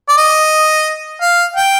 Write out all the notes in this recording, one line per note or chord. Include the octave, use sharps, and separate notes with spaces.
D5
D#5
F5
G5